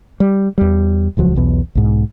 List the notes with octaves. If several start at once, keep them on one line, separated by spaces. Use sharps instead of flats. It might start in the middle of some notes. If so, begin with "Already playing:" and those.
G3
E2 G3
D#1 C#2 F3 F#3
B1 E2 B2
B1 G#2